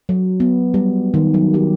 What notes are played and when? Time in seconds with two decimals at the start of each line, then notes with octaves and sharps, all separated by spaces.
0.09 F#3
0.40 B3
0.74 G3
1.14 D#3
1.34 F#3
1.54 G4